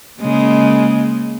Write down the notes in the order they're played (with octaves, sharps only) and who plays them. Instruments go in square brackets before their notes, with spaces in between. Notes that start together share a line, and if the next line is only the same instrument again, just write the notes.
[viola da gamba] C#3 G#3 A#3